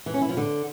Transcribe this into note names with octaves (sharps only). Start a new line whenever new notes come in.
E3
C#4
E4
F3
D3